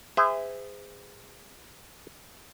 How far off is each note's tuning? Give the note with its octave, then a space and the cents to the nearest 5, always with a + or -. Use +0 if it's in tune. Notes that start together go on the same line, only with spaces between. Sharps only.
G#4 -25 C5 -40 E5 +0